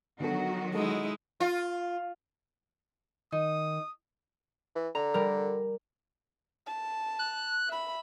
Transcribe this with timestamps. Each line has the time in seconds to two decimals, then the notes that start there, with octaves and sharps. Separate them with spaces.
0.20 D3 D#3 F#3 B3 F#4 A4
0.75 G#3 D#4 E4 A4
1.40 F4
3.32 D#3 D#4 D#6
4.76 E3
4.95 D3 A#5
5.14 G3 A#4
6.66 A5
7.19 F#6
7.68 E5 B5